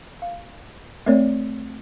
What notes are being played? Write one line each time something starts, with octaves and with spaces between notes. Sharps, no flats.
F5
A3 A#3 C4 A#4 C#5 D5